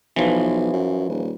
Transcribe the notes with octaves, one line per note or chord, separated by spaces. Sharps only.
B1 E3 F3
F#2
D#1